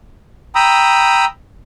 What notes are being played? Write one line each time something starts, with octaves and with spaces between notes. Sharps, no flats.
G5 A#5 B5 D#6 E6